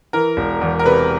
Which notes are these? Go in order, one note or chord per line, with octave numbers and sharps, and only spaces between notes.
E3 A#4
E1
E2
A#4
C3 B4